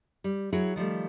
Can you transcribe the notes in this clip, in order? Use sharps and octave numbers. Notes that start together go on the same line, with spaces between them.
G3
F#3 E4 F#4 G#4
D#3 F3 G3 A3